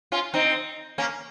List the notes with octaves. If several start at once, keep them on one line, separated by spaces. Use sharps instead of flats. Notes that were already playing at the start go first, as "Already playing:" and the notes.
C#4 F4
C4 D#4
A#3 C#4